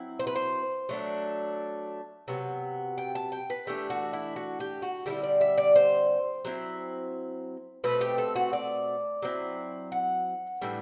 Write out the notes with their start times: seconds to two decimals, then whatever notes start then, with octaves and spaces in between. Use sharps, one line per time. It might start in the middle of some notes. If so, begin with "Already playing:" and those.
Already playing: F#3 C4 E4
0.19 C5
0.27 B4
0.35 C5
0.89 F#3 A3 D4
2.28 C3 F#3 B3
2.98 G5
3.15 A5
3.32 G5
3.50 B4
3.67 E3 A3 D4 G4
3.90 F#4
4.13 E4
4.36 F#4
4.60 G4
4.82 F#4
5.06 D3 G3 C4 E4 G4
5.23 D5
5.41 E5
5.58 D5
5.76 C5
6.45 F#3 C4 E4
7.84 B2 A3 C4 B4
8.01 G4
8.18 A4
8.36 F#4
8.53 D5
9.22 F#3 C4 E4
9.92 F#5
10.62 A2 E3 G3 D4